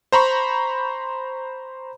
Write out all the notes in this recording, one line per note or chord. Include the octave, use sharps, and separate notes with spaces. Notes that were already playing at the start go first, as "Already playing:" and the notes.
C5 A#5 B5 C#6